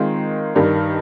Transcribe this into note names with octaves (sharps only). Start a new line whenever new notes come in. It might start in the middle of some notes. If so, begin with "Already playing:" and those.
Already playing: D#3 G#3 C4 F4
G2 D#3 G3